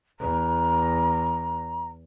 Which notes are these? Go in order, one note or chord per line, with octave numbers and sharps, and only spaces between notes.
E2 A#5